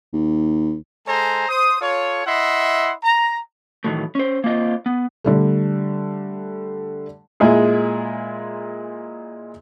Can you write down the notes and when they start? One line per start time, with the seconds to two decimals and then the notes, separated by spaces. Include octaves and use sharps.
0.13 D#2
1.07 G#3 A4 C5 G#5 A#5
1.49 C5 D#6
1.81 F4 A4 C#5
2.26 E4 D#5 E5 F#5 C6
3.03 A#5
3.84 A2 D#3 E3 F#3 A3
4.15 C#4 C5
4.44 A#3 C4 F4 D#5
4.86 B3
5.24 D3 G3 A3
7.40 A#2 G#3 E4 G#4